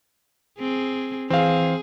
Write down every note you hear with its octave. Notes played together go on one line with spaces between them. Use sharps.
C4 G#4
E3 C4 G#4 F5